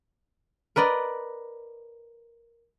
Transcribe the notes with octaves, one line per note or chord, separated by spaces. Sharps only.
A#4 B4 D5 D#5